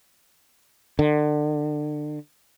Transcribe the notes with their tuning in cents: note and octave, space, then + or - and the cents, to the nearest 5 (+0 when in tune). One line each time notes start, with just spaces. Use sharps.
D3 +30